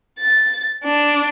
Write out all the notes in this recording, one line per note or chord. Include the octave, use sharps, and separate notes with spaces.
A6
D4